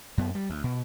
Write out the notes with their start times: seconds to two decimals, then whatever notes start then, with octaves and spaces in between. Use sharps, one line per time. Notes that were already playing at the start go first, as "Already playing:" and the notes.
0.18 F#2 B3
0.35 G3
0.50 D2
0.64 B2